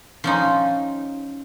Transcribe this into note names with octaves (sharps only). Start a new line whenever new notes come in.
F3 C#4 D#4